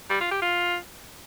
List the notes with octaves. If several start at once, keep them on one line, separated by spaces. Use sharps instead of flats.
G3
F4
G4
F4